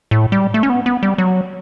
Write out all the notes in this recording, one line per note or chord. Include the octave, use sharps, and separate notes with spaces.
A2
G3
A3
C#4
B3
B3
G3
F#3